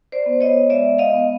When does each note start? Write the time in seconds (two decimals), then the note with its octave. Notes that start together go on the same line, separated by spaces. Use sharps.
0.12 C5 D5
0.26 B3
0.41 C#5 D#5
0.70 G#3 D5 E5
0.98 D#5 F5
1.14 B3